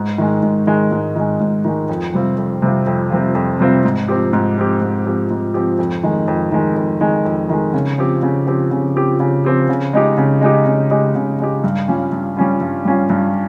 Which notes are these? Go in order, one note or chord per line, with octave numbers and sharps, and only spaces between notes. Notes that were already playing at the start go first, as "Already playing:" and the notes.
Already playing: G#2
D#3 G#3
G#2
D#3 G#3
G#2
D#3 G#3
G#2
D#3 G#3
F2
C3 G3 C4 F4
F2
C3 G3 C4 F4
F2
C3 G3 C4 F4
F2
C3 G3 C4 F4
G#2
F3 C4 G4
G#2
F3 C4 G4
G#2
F3 C4 G4
G#2
F3 C4 G4
F2
D#3 G#3
F2
D#3 G#3
F2
D#3 G#3
F2
D#3 G#3
C#3
F3 C4 G4
C#3
F3 C4 G4
C#3
F3 C4 G4
C#3
F3 C4 G4
C#3
G#3 D#4 G4
C#3
G#3 D#4 G4
C#3
G#3 D#4 G4
C#3
G#3 D#4 G4
G2
G3 C#4 F4
G2
G3 C#4 F4
G2
G3 C#4 F4
G2